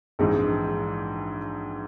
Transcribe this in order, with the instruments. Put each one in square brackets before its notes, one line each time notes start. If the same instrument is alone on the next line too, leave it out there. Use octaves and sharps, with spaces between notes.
[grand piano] A#1 G#2 E3 G#3 D#4 [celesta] G#4